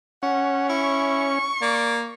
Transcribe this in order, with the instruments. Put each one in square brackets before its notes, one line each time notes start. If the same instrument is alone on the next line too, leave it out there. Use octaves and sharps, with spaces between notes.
[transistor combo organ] C#4 [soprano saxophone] F#5
[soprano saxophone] E4 [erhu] C#6
[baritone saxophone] A#3 [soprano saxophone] D5